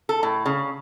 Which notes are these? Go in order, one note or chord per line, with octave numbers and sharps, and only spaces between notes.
A4
A2
C#3